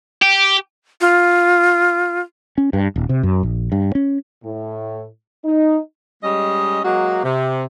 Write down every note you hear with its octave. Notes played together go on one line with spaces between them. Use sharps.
G4
F4
C#4
G2
D#1
C3
F#2
A#1
G2
C#4
A2
D#4
G3 G#3 C#4 D#5
F#3 G#3 A#3 F#4
C3